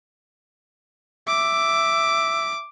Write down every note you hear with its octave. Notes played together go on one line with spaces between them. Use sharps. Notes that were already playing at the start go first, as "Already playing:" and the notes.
E5 D6